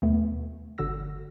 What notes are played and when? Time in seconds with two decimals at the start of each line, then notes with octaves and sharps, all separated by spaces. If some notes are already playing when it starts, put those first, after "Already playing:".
0.02 D#2 B2 A3 B3
0.78 G1 D3 F#4 E6 A#6